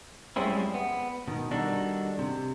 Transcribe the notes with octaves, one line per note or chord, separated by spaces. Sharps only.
F#2 G3 G#3 C4 C#4 E4
B3
B2 D#3
D#3 G3 D4 D#4 F#4 A4
C3